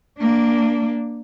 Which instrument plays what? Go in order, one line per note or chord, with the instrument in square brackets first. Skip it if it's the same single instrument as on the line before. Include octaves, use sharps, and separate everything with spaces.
[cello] A#3 D4